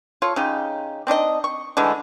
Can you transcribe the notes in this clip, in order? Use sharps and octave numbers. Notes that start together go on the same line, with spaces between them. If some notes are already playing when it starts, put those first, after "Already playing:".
F4 A4 C#5
C#3 D#4 G4
C4 D4 D#4 D#5
C#6
D3 E3 G#3 A3